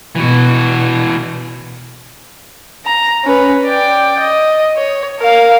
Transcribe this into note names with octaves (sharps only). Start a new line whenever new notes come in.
B2 E3 F#4
A#5
C#4 B4
D5 G5
D#5
C#5
A#4 F5